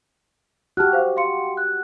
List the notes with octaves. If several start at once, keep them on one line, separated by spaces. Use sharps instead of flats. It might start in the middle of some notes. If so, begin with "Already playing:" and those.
F#4 G4 A5 F6 F#6
C5 F5
F5 C6 C#7
F#6